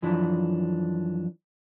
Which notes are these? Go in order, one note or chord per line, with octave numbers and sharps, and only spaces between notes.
F#2 E3 F3 D4